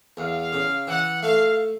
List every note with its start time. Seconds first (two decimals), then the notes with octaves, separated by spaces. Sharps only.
0.17 E2 F5
0.53 C#3
0.87 E3 F#5
1.22 A3 F5